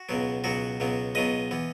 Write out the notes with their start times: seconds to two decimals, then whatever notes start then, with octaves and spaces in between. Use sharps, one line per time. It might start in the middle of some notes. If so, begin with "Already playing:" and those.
Already playing: F#4
0.09 C#2 B2 F#3 B3
0.44 C#2 B2 F#3 B3 F#4
0.80 C#2 B2 F#3 B3
1.15 C#2 B2 F#3 B3 B4 D#5
1.51 E3 B3